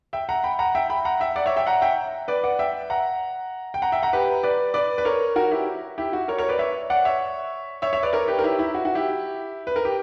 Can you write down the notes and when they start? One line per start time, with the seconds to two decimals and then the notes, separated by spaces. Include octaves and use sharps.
0.13 E5 G5
0.29 F#5 A#5
0.44 G5 B5
0.59 F#5 A#5
0.75 E5 G5
0.90 G5 B5
1.05 F#5 A#5
1.20 E5 G5
1.36 D5 F#5
1.46 C#5 E5
1.56 E5 G5
1.67 F#5 A#5
1.82 E5 G5
2.28 B4 D5
2.44 D5 F#5
2.59 E5 G5
2.90 F#5 A#5
3.74 G5
3.82 F#5 A#5
3.92 E5 G5
4.03 F#5 A#5
4.13 G4 B4
4.43 B4 D5
4.74 B4 D5
4.98 B4
5.05 A#4 C#5
5.36 F#4 A#4
5.51 E4 G4
5.98 E4 G4
6.13 F#4
6.28 A#4 C#5
6.38 A#4 C#5
6.49 B4 D5
6.59 C#5 E5
6.90 D5 F#5
7.05 C#5 E5
7.82 C#5 E5
7.93 C#5 E5
8.03 B4 D5
8.13 A#4 C#5
8.28 G4 B4
8.39 A#4
8.44 E4 G4
8.59 E4
8.74 F#4
8.85 F#4
8.95 E4 G4
9.67 B4
9.76 A#4
9.85 G4